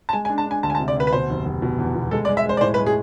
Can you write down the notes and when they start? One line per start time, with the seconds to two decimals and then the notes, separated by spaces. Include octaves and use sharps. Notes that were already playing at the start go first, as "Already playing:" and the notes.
0.09 A5
0.13 G#3 G#5
0.25 G#5
0.30 D4
0.38 A5
0.46 D4 G#5
0.63 D2 A5
0.70 G#5
0.75 A5
0.80 C3
0.88 D5
0.96 D2 B4
1.07 B4
1.13 B2 C5
1.30 F1
1.46 F1
1.62 B2
1.79 E2
1.95 B2
2.11 G#3 A4
2.25 D5
2.28 G#3
2.37 E5
2.46 G#3 C5
2.57 D5
2.61 A2 C5
2.74 B4
2.78 G#3
2.86 G#4